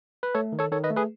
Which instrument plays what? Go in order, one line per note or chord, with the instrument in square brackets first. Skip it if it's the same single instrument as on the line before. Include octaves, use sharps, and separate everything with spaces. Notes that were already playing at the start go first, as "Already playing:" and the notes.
[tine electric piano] B4
A3 A4 C#5
D#3
A4 C#5
D#3 A4 C#5
B4 D#5
A3
G#4 B4